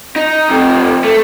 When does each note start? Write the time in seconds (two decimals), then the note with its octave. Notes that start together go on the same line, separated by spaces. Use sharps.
0.16 D#4
0.49 F2 C3
1.04 A3